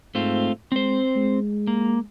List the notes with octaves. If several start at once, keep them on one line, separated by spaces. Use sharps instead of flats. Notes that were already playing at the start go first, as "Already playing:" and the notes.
G#2 A3 C4 F4
G#3 C4 C5
G#3
A#3